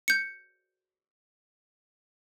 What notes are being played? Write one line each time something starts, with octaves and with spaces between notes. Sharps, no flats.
G6 C#7